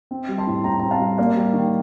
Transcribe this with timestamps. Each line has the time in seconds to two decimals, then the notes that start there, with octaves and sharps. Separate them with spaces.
0.11 C4
0.29 G3
0.38 A5 C6
0.47 A2
0.64 A2 G5 A#5
0.79 C4 A#5
0.91 F5 A5
1.00 G3
1.18 A#3 D5 F5
1.36 G3
1.53 D#3